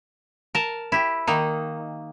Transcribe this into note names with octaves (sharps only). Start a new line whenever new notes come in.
A#4 A5
E4 G4
D#3 A#3 D#4